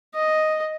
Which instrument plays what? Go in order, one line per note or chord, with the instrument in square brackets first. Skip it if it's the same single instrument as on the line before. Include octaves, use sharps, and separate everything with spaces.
[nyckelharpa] D#5